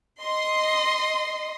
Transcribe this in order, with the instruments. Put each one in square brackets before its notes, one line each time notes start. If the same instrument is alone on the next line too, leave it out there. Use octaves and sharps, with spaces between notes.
[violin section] D#5 C6